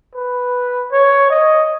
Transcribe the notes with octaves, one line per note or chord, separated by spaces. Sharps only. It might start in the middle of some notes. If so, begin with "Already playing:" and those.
B4
C#5
D#5